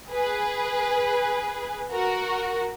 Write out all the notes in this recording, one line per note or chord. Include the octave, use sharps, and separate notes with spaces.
G#4 B4
F#4 A#4